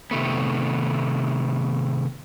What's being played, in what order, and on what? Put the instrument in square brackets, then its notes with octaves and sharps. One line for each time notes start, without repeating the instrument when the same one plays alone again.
[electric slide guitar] C3 D#3 A3 B3